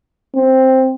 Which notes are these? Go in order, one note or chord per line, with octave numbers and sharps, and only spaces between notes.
C4